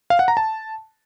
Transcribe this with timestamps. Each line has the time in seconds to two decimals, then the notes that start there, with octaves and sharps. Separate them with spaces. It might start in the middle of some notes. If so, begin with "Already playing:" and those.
0.10 F5
0.19 F#5
0.28 A#5
0.37 A5